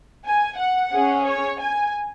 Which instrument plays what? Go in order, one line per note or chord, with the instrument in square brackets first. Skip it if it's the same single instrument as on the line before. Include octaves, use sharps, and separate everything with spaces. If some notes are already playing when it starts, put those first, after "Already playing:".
[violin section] G#5
F#5
C#4 G#4
C#5
G#5